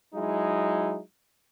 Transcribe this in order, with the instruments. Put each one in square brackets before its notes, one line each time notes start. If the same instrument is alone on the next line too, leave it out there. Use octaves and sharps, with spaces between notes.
[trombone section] F#3 G#3 D#4 E4